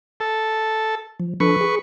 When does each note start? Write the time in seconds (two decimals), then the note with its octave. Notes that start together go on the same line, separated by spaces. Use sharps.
0.20 A4
1.20 F3
1.40 F3 D4 A4 B4 C#6
1.61 G#4